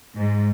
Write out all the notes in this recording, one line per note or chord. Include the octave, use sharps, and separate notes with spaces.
G#2